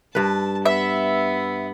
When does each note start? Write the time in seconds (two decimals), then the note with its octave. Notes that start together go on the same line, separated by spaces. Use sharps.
0.15 G2 B4 A5
0.66 B3 E5